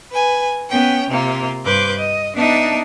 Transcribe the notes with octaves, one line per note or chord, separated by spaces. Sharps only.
B4 G#5
B3 C#4 G5
C3 A#3 F4
G2 B4 C5 D6 G6
D#5
B3 D4 D#4 E5 A5